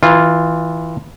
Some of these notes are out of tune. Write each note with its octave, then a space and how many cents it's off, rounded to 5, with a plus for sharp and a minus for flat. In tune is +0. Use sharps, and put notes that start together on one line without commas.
E3 -20 F4 +0